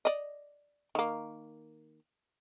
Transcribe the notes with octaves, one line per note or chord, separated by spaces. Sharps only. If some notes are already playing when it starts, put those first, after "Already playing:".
D5 D#5
D#3 A#3